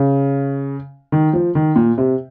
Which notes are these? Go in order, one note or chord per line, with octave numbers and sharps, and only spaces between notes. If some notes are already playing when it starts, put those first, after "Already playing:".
Already playing: C#3
D#3
F3
D#3
A#2
C3